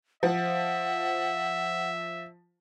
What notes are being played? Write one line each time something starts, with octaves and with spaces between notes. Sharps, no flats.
F3 E5 F#5